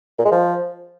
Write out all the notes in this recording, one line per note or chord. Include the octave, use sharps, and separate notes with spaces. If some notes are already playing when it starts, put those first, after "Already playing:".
A#2
G#3
F3